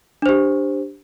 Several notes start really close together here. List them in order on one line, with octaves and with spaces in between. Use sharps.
D4 C5 G4